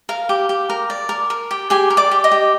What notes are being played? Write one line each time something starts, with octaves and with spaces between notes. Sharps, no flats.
A#4 F5
G4
G4
A#4
D5
A#4
A#4
G4
G4 G#4 G#5
A#4
D5 D6
G4
D#5 D#6
G4